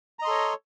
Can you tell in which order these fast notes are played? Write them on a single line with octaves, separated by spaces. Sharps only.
A#5 D#5 C6 A4 C#5